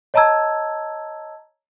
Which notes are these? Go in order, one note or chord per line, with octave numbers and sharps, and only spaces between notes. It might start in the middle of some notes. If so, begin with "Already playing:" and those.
C#5 D#5 A5 A#5 E6 G#6